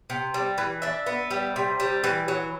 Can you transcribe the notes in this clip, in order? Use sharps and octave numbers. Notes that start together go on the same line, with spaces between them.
C3
G3
E3
D4 E5
B3
G3
C3
G3
E3
F#3